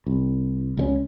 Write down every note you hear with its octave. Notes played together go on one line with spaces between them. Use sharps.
C2
C#2 G3 C#4